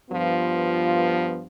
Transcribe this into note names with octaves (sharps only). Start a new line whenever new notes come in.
G2 F3 B3 F4